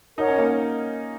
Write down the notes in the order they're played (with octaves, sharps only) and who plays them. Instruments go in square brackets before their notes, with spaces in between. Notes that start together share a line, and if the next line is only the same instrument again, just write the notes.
[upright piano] D#4 [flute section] A#4 C#5 F#5
[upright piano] C#4
A#3